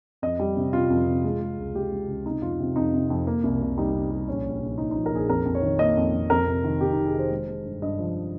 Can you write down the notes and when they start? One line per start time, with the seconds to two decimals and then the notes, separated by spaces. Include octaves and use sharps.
0.22 F2 D#5
0.40 G3
0.57 C3
0.73 C3 F4
0.90 F2
1.07 C3
1.24 G#3
1.41 G#3
1.58 C#2
1.75 G#3 G4
1.92 G#3
2.08 C#2
2.26 C3 D#4
2.42 F2 F4
2.60 C3
2.76 F2 D#4
2.93 C3
3.10 F2
3.27 A#3
3.44 C2
3.61 C2
3.78 G3 D#4
3.94 C3
4.11 G3
4.28 A#1 C#4
4.45 A#1
4.61 A#1
4.78 A#1 D#4
4.91 D#4
4.96 F3
5.06 A#4
5.11 A#1 G#4
5.29 F2 A#4
5.45 F2
5.55 C#5
5.62 D#3
5.79 A#3 D#5
5.97 F2
6.13 F2
6.30 F2 A#4
6.46 C3
6.64 D#3
6.81 C3 G4
6.93 D#4
6.97 F1
7.06 G#4
7.14 D#3 C5
7.31 G#3
7.48 G#3
7.65 G2
7.82 G2 D#5
7.99 F3